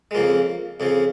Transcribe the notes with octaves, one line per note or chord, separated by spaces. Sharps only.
G#3
F2 C#3 F3 A#3
F2 C#3 F3